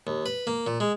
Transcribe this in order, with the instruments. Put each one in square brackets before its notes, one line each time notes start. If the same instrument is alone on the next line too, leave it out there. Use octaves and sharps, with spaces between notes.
[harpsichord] D#2
B4
A#3
A#2
G#3